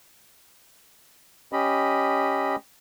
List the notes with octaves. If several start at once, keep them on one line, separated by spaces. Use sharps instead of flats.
C#4 G4 D#5 B5